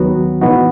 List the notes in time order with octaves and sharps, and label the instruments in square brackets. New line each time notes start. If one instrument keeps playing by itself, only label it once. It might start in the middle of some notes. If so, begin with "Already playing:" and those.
Already playing: [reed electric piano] D#2 D#3 F#3 B3 F#4
A2 E3 B3 D#4 F#4